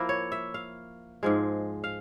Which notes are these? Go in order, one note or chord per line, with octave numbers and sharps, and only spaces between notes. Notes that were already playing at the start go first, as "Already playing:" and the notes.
Already playing: F3 A#3 E4 A#4
C#5
E5
F5
G#2 F3 G#3
F5